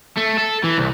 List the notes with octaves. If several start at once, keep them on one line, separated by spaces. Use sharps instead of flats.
A3
A4
E3
C2